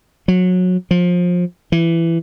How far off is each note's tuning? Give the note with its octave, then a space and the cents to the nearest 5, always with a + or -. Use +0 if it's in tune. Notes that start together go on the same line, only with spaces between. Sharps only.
F#3 -20
F3 +25
E3 +15